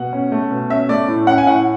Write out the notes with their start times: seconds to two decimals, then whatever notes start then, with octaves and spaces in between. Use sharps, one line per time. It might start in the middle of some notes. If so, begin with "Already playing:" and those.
Already playing: B2 F#5
0.13 C#4
0.32 A3
0.51 B2
0.70 C#4 E5
0.89 A3 D5
1.08 A2
1.27 C#4 F#5
1.38 G#5
1.46 A2 F#5